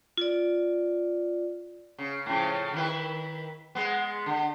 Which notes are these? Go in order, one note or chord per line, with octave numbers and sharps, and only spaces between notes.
F4 D5
C#3
A2 C#3 F3
D#3 E4 B4
G#3 B3
D3